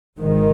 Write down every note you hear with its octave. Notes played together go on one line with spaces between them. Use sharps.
G#1 G#2 D#3